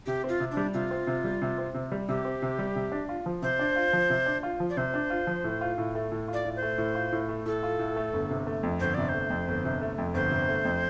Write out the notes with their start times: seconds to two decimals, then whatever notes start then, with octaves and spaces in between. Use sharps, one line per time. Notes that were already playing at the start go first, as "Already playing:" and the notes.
0.06 C3 G4
0.24 C4
0.29 F4
0.40 C3
0.51 D4
0.57 G3
0.74 C3 F4
0.91 C4
1.07 C3
1.24 G3
1.42 C3
1.58 C4
1.74 C3
1.92 G3
2.09 C3 G4
2.25 C4
2.42 C3
2.59 G3
2.76 C3
2.92 D4
3.09 F4
3.26 F3
3.42 C3 C5
3.59 D4
3.76 F4
3.93 F3
4.10 C3
4.26 D4
4.43 F4
4.60 F3
4.70 D5
4.77 C3 C5
4.94 D4
5.10 F4
5.27 F3
5.44 A2
5.61 F4
5.78 A2
5.95 A3
6.12 A2
6.28 F4
6.34 D5
6.45 A2
6.56 C5
6.62 A3
6.78 A2
6.95 F4
7.12 A2
7.29 A3
7.46 A2 A4
7.63 F4
7.79 A2
7.96 A3
8.13 G1
8.30 C3
8.47 A3
8.63 F2
8.80 G1 C5
8.94 C3 D5
9.09 A3 C5
9.30 F2
9.48 G1
9.65 C3
9.81 A3
9.98 F2
10.14 G1 C5
10.31 C3
10.49 A3
10.65 F2